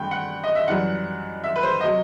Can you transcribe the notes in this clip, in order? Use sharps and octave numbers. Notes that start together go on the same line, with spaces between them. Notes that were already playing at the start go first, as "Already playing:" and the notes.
Already playing: G2 A3 G5 B5
F#5
D#5
E5
F#2 E3 G3 F#5
E5
B4
C5
C3 F#3 D#5